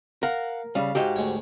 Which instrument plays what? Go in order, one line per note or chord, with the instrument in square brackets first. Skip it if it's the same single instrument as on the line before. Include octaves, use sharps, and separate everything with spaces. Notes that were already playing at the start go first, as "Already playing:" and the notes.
[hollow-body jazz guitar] A#4 [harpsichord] F5 F#5
[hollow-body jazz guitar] C#3 G3 [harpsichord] F5
[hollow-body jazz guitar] G#2 F#4 G4
[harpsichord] D2 G#3 C#5